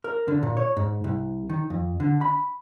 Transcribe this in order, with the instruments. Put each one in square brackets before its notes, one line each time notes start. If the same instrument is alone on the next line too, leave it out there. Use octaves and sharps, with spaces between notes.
[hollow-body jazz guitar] A#4
D3
A#2
C#5
G#2
C2
D#3
F2
D3
B5